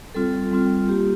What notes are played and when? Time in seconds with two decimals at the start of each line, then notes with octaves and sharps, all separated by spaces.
0.14 G3 C4 F4 A4
0.52 G3 C4 F4
0.88 A#3 F4 G4